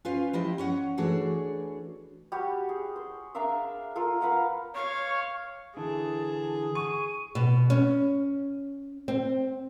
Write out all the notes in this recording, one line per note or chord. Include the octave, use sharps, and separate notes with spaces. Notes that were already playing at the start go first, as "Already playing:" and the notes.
C#4 F4 B4 C5 F5
F3 E4 G4 D#5
C#4 C#5 F#5
E3 A3 D4 F#4 G#4 C#5
G3 F#4 G4
G#4
C5
D4 A#4 E5 F5
F4 A4 A#4
A#4 B4 F5 F#5
C#5 F5 C#6
D3 E3 G#4 A5
C#6 D#7
B2
C#4
C4